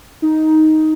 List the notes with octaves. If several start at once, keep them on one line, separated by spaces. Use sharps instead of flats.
D#4